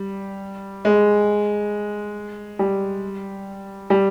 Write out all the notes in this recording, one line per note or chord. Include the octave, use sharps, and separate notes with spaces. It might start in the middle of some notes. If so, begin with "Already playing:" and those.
Already playing: G3
G#3
G3
G3